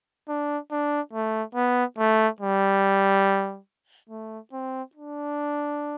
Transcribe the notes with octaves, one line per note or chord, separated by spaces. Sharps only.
D4
D4
A3
B3
A3
G3
A3
C4
D4